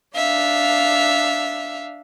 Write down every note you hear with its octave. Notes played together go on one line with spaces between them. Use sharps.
D4 E5 F5